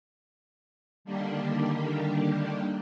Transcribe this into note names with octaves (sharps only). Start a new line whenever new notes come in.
D3 D#3 G3 A#3 D4 G4